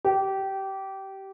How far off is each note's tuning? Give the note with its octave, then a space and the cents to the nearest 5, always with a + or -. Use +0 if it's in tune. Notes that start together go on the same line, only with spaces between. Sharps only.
G4 -20